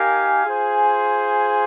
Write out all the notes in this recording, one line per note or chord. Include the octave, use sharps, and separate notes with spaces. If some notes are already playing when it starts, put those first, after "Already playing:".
Already playing: D#4 G4 A#4 F5 G#5
F4 G#4 C5